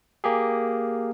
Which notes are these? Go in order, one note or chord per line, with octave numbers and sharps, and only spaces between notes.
A#3 G4 G#4